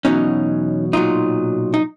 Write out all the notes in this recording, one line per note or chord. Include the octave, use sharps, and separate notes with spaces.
E2 B2 F#3 C#4 D#4
B1 A#2 F#3 D#4 F4
D#4